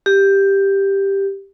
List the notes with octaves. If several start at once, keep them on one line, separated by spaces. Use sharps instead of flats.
G4